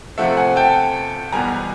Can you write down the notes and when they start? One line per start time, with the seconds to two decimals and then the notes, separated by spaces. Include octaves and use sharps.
0.18 C3 F3 A3 E5 F#5
0.37 F#5 G#5
0.56 G5 A5
1.32 E2 B2 G3 B3 G#5 A#5